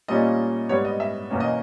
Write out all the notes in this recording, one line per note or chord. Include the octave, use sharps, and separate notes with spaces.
A#2 G3 A#3 C#4 D#5
G#2 G3 B3 C#5
D#5
E5
E2 B2 A#3 C#4
D#5